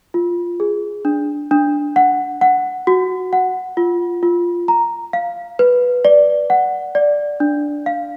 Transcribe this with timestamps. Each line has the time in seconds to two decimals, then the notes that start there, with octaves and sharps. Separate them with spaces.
0.14 F4
0.60 G#4
1.05 D4
1.51 D4
1.96 F#5
2.41 F#5
2.87 F#4
3.33 F#5
3.77 F4
4.23 F4
4.68 A#5
5.13 F5
5.59 B4
6.05 D5
6.50 F#5
6.95 D5
7.40 D4
7.86 F5